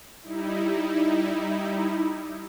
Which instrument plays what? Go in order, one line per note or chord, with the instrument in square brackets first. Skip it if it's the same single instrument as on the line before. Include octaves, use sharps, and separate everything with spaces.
[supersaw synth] G3 D#4 E4